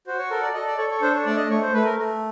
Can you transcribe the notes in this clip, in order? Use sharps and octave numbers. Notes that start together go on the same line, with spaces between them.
F#4 C5
C#5
A4 A#4
D5
A4 D#5
D5
A4 C#5
C#5
D4 C5
C#5
A3 D5
D#5
A3 C#5
C5
A3 B4
A#4
A3